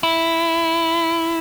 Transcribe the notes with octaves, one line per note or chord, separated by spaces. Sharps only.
E4